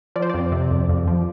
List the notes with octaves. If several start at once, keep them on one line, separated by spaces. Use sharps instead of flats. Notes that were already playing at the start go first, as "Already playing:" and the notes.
F3 D5
C5
F2 D5
C3
F2
F2
F3